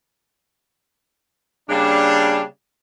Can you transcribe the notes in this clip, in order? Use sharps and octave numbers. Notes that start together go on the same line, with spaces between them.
C#3 G3 A#3 D4